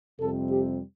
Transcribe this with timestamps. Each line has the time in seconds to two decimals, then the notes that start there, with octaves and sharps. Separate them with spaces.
0.19 F2 C3 G3 C4 A4
0.51 G4